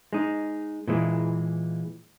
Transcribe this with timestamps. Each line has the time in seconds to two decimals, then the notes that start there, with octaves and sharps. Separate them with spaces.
0.13 G#3 D#4
0.87 A#2 E3 G#3